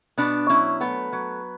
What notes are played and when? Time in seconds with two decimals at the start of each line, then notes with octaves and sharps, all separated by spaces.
0.18 B2 B3 D4
0.49 F#3 C#4 E4
0.81 A3 B3
1.13 F#3